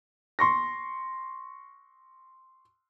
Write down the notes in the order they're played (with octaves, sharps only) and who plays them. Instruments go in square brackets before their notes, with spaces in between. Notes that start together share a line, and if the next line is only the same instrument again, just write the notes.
[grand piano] C6 C#6 A#6